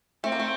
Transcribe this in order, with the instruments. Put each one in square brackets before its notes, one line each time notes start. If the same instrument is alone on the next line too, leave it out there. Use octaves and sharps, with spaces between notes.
[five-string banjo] A3 [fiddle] C4
[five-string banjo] A#3
A3